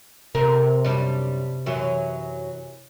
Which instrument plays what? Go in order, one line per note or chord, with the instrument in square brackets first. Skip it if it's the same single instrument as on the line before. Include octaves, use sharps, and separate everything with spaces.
[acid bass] C3 [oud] A#4
[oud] F#2 G3 D4
F#2 E3 F#3